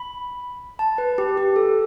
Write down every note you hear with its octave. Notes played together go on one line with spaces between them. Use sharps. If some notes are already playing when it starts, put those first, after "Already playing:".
Already playing: B5
A5
B4
G4
G4
A4